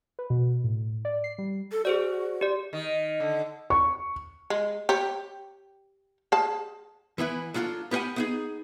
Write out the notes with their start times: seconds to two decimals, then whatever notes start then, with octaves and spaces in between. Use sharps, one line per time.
0.19 B4
0.30 B2
0.64 A2
1.05 D5
1.24 C7
1.38 G3
1.72 A4
1.85 F#4 G#4 C5 D5
2.41 G4 D5
2.73 D#3
3.20 D3
3.70 C#6
4.50 G#3
4.89 G4 C#5
6.32 G#4 A5
7.18 E3 B3 E4 B4
7.54 F#3 D4 F4 F#4 A4
7.91 B3 G4 G#4 D5 F#5 G#5
8.16 B3 D#4 G#4